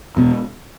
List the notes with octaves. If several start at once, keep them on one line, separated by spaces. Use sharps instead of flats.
E2 B2